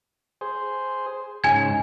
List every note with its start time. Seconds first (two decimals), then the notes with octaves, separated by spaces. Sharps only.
0.41 G#4 C5
1.44 G#2 C#3 G#5 G#6